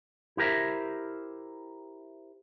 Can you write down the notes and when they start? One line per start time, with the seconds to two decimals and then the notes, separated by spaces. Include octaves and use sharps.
0.37 E4 G4 A#4 C5 E5